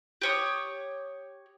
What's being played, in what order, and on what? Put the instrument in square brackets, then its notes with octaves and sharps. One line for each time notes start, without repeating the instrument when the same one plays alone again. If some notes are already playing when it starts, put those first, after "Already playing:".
[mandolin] G4 C#5 D#6